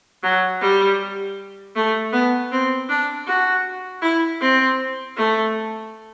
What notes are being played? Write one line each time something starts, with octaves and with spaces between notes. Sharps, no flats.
F#3
G3
A3
B3
C4
D4
F#4
E4
C4
A3